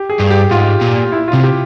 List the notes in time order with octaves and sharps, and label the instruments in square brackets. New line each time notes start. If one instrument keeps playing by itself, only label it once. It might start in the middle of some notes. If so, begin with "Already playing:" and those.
Already playing: [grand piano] G4
G#4
[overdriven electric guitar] G2
[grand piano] G4
[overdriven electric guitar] G#2 [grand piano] F4
[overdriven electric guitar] A#2
[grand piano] E4
F4
[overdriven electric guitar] C3
[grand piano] G4